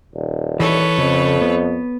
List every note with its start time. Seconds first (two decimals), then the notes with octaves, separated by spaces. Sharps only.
0.14 D#1
0.60 E3 A4 B4 C#5
0.98 F2 C#3
1.42 B3